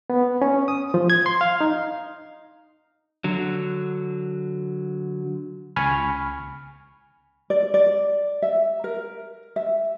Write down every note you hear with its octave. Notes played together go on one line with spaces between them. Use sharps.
B3
C#4
D#6
F3
G#6
C6
F5
D#4
D3 F#3
C#2 G#5 B5 C#6 F6
D5
D5
E5
A#4
E5